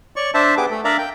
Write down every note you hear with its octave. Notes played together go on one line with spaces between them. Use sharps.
C#5 D5 C#6
D4 C5 E5 A5
B3 G4 G#4 B4 D6
A3 A4
D4 A#4 D5 E5 F5 A#5
G5